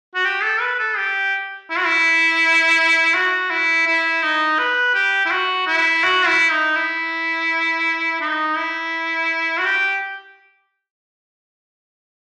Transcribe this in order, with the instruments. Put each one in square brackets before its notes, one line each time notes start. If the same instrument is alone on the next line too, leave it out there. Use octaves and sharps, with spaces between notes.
[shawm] F#4
G4
A4
B4
A4
G4
E4
F#4
E4
F#4
E4
E4
D#4
B4
G4
E4
F#4
E4
F#4
E4
D#4
E4
D#4
E4
F#4
G4